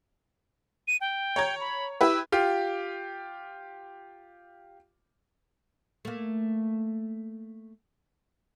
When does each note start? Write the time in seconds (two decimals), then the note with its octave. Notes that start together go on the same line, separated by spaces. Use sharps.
0.88 D#7
1.01 G5
1.36 C#5 A#5 G#6
1.60 B5
2.01 E4 G4 B4 E6
2.32 F4 G4
6.05 A3 A#3